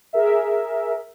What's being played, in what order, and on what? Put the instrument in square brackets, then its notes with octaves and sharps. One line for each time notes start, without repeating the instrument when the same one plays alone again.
[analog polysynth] G#4 A#4 E5